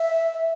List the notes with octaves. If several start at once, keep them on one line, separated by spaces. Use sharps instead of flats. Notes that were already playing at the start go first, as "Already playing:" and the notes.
Already playing: E5